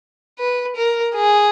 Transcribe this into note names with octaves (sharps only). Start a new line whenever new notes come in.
B4
A#4
G#4